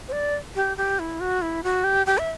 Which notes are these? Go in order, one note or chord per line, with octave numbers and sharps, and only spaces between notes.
C5
D5
G4
G4
E4
F#4
E4
F#4
G4
G4
E5